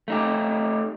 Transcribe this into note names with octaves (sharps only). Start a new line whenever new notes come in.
A3 D#4 G4